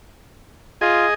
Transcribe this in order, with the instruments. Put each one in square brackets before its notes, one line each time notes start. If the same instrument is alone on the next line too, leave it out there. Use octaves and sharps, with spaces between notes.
[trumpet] F4 [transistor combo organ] G#4 D#5